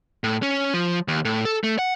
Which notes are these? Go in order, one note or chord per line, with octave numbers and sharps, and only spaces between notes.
A2
C#4
F3
D#2
A2
A4
A3
F#5